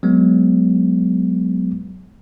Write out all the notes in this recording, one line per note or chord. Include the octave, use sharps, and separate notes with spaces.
F#3 G#3 B3